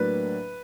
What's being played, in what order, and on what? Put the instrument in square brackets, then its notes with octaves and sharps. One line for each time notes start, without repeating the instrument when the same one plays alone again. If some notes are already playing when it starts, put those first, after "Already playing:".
Already playing: [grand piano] A2 F#3 A#3 D4 B4